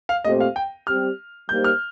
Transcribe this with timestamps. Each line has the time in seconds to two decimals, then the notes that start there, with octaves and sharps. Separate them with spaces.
0.09 F5
0.24 A#2 A3 C4 G4 C5 D#5
0.40 F5
0.56 G5
0.87 G3 C4 G4 F6
1.49 G3 A#3 D#4 G4 C5 G6
1.64 F6